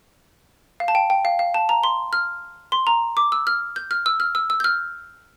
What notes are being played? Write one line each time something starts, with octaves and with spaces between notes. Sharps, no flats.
F5
A5
G5
G5
F5
F5
A5
A#5
C6
F6
C6
A#5
D6
E6
F6
G6
F6
E6
F6
E6
E6
G6
F6